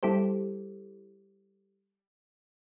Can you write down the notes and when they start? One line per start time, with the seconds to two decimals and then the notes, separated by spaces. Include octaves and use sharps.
0.03 G3 E4 G4 A4 C5